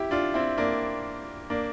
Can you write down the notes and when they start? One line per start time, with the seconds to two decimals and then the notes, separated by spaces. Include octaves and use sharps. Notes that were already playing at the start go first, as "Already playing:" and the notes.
Already playing: E4 G4
0.11 D4 F4
0.34 C4 E4
0.58 A#3 D4
1.50 A#3 D4